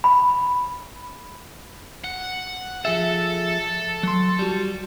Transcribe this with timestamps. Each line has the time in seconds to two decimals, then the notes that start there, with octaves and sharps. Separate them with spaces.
0.04 B5
2.04 F#5
2.85 F3 G#4 A4 E5
4.03 F#3 C6
4.39 G3 F#4